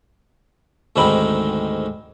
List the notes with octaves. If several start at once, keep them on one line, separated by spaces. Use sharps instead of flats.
D2 G#2 D#3 C4 B5